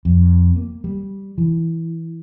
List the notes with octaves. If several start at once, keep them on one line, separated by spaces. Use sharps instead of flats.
F2
A#3
G3
E3